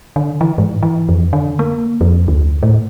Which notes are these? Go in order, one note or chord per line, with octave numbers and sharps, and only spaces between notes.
D3
E3
G#2
E3
F2
D3
A#3
F2
D2
A2